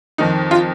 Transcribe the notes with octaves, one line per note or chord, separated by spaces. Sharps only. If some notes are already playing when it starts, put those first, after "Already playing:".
F2 D#3 D#4
F4